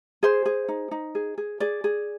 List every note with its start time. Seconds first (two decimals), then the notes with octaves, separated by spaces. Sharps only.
0.23 G#4 C5
0.46 G#4
0.68 D#4
0.91 D#4
1.15 G#4
1.38 G#4
1.60 G#4 D5
1.84 G#4